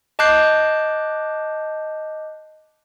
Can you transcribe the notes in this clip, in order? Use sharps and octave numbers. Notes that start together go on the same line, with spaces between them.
D#5 A5 D6 F#6 G6 C7